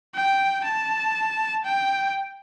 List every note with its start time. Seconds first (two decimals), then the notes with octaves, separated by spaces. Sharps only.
0.15 G5
0.65 A5
1.65 G5